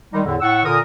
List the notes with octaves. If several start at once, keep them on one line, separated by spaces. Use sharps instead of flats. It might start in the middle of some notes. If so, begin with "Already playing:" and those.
D#3 G3 G#3 D#4
E2 A2 D3
A2 F#5 C#6 E6
A#2 D3 A#4 D#6